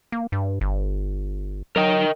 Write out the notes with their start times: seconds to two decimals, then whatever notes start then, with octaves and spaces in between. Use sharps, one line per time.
0.12 A#3
0.32 G2
0.61 G1
1.76 F#3 A#4 D#5 G5